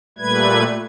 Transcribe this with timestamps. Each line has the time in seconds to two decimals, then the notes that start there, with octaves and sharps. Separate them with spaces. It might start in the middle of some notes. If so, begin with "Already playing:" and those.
0.18 A#2 G3 A3 B4 G#6